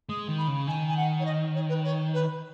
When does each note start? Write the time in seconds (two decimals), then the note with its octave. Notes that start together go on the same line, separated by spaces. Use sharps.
0.09 G#3 D#6
0.28 D#3
0.38 B5
0.47 C#3
0.67 D#3 G#5
0.88 G#5
0.96 F#5
1.19 C#5
1.25 D#5
1.54 C#5
1.69 B4
1.83 C#5
2.13 B4